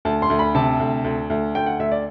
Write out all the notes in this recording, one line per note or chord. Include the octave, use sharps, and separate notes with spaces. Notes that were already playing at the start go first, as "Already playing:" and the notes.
D2 A5
C6
D2
B5
C3 A5
D2
D2
D2
D2 G5
F#5
D2 E5
D5